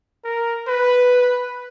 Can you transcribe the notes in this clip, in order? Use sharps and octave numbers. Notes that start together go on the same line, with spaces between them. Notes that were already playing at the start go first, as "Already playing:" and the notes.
A#4
B4